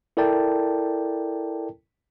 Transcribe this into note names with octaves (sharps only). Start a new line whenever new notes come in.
E4 A4 A#4 D5 G5 A5